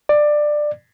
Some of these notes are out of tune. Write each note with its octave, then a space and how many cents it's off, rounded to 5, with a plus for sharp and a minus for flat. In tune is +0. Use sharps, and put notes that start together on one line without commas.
D5 +15